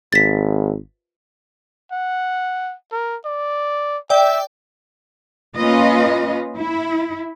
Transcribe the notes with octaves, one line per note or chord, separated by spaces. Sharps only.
G#1 A6 B6
F#5
A#4
D5
D5 E5 G5
A#3 C#4 F4 B4 D#5
E4